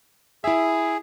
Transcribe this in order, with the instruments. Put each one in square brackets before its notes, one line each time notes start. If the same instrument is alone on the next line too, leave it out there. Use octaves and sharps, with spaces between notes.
[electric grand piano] E4 E5 [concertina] G#4